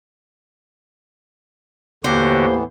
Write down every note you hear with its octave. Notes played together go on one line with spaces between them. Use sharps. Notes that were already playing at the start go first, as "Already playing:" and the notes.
D#2 A2 D3 E3 B3 F#4 G4 C5